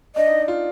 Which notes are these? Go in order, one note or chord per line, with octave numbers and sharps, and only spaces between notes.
D4 D#5
D#4
F4